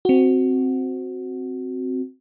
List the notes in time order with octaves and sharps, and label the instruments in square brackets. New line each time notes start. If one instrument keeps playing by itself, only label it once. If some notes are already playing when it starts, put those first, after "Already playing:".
[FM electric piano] C4 F#4